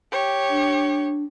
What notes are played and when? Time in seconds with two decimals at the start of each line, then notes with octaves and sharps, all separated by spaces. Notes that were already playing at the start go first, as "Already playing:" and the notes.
0.12 G4 C#5
0.50 D4